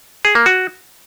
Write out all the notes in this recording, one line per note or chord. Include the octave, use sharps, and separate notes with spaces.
G#4
A#3
F#4